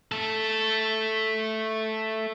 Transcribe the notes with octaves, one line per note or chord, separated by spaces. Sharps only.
A3 A4